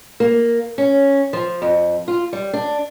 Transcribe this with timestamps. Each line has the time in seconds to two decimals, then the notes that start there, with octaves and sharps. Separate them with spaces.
0.20 A#3
0.78 C#4
1.33 F3
1.62 F2
2.08 F4
2.33 G3
2.53 D4